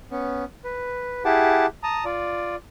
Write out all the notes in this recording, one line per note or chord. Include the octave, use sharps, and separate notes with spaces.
B3 C#4
B4
E4 G4 G#4 F#5 A5 D6
A5 A#5 D#6
F4 D5